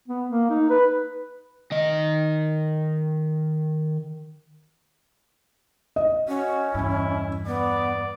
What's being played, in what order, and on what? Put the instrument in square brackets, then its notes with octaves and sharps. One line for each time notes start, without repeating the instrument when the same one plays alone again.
[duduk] B3
A#3
D#4
B4
[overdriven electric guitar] D#3 D#5
[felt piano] D#5
[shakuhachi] C#4 [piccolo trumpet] F#4
[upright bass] E2 G2 [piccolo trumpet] E4
[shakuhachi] B3 [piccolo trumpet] D5